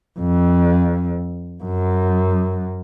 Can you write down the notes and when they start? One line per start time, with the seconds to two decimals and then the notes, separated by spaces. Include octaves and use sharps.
0.20 F2
1.64 F#2